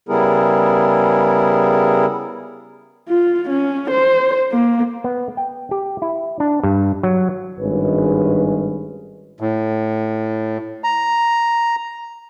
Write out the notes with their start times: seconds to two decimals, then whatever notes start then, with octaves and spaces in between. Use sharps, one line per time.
0.09 C#3 G3 B3 E4 G#4 A#4
3.09 F4
3.50 C#4
3.91 C5
4.52 A#3
5.04 B3
5.37 G5
5.71 G4
6.02 E4
6.40 D4
6.63 G2
7.03 F#3
7.59 G#1 G2 G#3 C#4 B4
9.40 A2
10.84 A#5